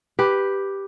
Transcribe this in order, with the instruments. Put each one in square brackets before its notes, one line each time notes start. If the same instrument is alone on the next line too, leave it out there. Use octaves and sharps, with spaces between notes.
[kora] G4 B4